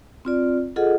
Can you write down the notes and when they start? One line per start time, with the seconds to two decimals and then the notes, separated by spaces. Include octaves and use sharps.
0.25 C4 F4 D5
0.76 F4 G#4 A4 D#5 F#5